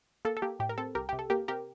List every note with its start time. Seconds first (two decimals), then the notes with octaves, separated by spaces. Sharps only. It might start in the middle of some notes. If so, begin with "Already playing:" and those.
0.25 A#3 A4
0.37 A4
0.42 A#3 G4
0.59 A2 G4
0.69 A#4
0.78 C4 A4
0.95 C2 G4 A#4
1.09 C3 G4
1.19 A4
1.30 A#3 G4 A#4
1.48 C3 G4 A#4